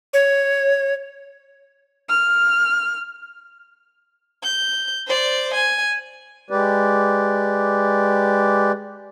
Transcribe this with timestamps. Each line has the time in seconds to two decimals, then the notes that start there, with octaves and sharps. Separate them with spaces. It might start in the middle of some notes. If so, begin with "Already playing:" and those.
0.14 C#5
2.09 F6
4.43 G6
5.07 C5 D5
5.54 G#5
6.50 G#3 G4 B4 D5